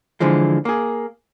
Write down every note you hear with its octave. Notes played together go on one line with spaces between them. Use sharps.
D3 E3 F3 G#3
A#3 G#4